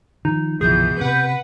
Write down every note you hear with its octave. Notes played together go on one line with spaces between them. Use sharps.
D#3 F3 D#4
G1 C2 B2 E3 F3 G#4 G6
C3 B4 F#5